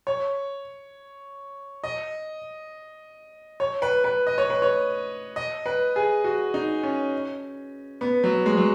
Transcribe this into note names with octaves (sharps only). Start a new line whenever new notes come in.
C#5
D#5
C#5
B4
B4
D#5
C#5
B4
C#5
D#5
B4
G#4
F#4
D#4
C#4
B3
F#3
G#3
F#3